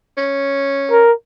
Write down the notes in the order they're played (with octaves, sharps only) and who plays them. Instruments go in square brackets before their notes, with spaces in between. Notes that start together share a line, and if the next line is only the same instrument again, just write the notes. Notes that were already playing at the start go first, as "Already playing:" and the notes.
[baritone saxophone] C#4
[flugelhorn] A#4